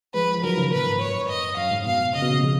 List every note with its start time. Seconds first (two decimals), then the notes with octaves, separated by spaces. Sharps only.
0.14 F3 G#3 B4
0.34 F3
0.43 D#3 F#3 A#4
0.57 C#3 F3
0.72 A#2 B4
0.86 G#2
1.01 F#2 C#5
1.29 D#5
1.57 F#2 F5
1.71 G#2
1.86 B2 F5
2.15 C#3 D#5
2.22 B2
2.31 A#2 C#3
2.43 C#3 F3